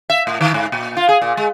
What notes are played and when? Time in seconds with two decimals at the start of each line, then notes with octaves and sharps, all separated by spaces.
0.10 E5
0.27 A2
0.41 D#3
0.54 G#2
0.72 A#2
0.97 F4
1.09 G#4
1.21 A#2
1.37 G#3